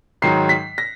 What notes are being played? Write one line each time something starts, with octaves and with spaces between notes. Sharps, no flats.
G#2 D#3 F#3 C7
B6
A#6